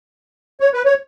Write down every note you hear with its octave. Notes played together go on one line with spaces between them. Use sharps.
C#5
B4
C#5